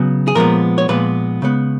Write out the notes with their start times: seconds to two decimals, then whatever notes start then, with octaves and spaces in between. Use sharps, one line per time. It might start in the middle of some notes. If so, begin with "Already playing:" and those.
Already playing: C#3 F#3 B3
0.28 G#4
0.35 A#2 F3 G#3 B3 A#4
0.78 C#5
0.89 A#2 F3 G#3 B3 B4
1.42 C#3 G#3 B3